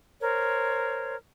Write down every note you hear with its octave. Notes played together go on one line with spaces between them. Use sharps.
A#4 C5 C#5